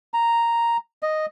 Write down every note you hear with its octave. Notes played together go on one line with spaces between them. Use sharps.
A#5
D#5